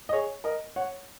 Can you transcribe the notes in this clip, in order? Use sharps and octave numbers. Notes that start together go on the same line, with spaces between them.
D#5
G#4 C#5
A#4 D#5
C#5 F#5